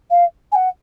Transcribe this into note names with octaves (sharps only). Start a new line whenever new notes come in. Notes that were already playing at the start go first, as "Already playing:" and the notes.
F5
G#5
F#5